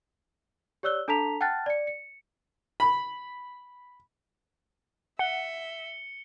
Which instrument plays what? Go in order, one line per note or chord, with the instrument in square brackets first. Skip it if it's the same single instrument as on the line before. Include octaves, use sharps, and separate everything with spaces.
[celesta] G4 C#5 D5 E6 F#6 G7
D4 A4 A5 A#5 B6 F7
F#5 G5 A5 F6 F#6 A6
D5 C#7
C#7
[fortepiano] B5
[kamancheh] E5 [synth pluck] F#5 [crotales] C#7 G7